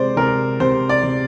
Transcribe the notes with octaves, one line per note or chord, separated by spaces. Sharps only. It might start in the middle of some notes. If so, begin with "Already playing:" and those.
Already playing: C3 G#3 C5 D5
C3 A#4
C3 C5
D5
C3